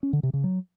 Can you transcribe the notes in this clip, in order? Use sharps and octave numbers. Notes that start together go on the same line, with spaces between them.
C#4
D3
C3
C#3
F#3